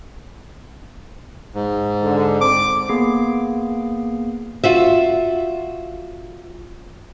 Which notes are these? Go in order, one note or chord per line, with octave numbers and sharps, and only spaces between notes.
G#2
D3
C4 D6
A#3 B3 G#4 C7
F4 F#4 E5